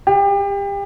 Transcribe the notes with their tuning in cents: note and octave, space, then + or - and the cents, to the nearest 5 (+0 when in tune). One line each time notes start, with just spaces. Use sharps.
G4 +30